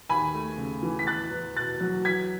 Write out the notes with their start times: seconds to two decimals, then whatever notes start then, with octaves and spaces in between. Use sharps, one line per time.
0.10 D#2 G#5 B5
0.34 A3
0.58 C#3
0.83 E3
0.99 B6
1.07 E2 F#6 A6
1.31 E2
1.56 B2 F#6 A6
1.81 F#3
2.05 E2 G#6 B6